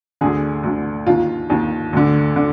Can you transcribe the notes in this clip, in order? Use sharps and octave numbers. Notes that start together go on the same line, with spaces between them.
D2 D3 G#4
D2 D3
D#2 D#3 F4
D#2 D#3
D2 D3
D3